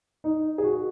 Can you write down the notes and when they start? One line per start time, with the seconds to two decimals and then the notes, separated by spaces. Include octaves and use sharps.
0.24 D#4
0.58 G#4
0.64 F#4